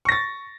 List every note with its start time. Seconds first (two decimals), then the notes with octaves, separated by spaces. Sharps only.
0.05 C#6
0.09 A#6
0.12 A6